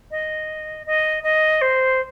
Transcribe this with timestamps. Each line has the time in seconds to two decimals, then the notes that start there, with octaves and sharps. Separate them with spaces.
0.11 D#5
0.86 D#5
1.23 D#5
1.61 C5